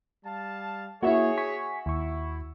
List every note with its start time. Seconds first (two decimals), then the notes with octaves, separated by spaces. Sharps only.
0.25 G3 F5 A5
1.03 A#3 E4 F#4 G#4 C#5 E5
1.38 G#5 C#6 B6
1.86 D#2 E4 C#6